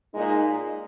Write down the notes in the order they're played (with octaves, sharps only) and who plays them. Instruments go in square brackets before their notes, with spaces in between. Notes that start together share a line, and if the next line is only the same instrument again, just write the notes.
[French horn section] A#2 G#3 D#4